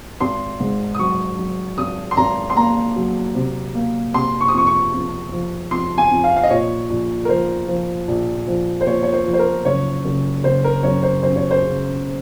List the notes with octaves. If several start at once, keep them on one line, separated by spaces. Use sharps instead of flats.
G#1 C6
G#2
D#6
F#3 C#6
F#3
G#1 D#6
C6
G#1 A#5
C6
A#3 A#5
F#3
C3
A#3
C3 C6
C#6
D#6
F2 C#6
C#6
F2
F3
F2 C6
G#5
F2
F5
F5
D#5
A#2 C#5
A#1
A#4
F3 C5
F3
A#1
F3
C5
A#2 C#5
C#5
C5
F3
C5
A#4
F#1 C#5
F#1
F#1 C5
A#4
F#2 C#5
C5
F#2 C5
C#5
C5
C#3